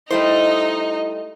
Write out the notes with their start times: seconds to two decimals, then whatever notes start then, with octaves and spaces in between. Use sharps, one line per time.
0.11 G3 A3 D#4 E4 C5 D#5